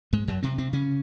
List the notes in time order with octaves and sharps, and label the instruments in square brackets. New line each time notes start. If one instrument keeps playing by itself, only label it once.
[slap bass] G#2 G#3
F#2 F#3
C3 C4
C3 C4
C#3 C#4